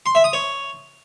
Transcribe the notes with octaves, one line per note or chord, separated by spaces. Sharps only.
C6
E5
D#6
C#5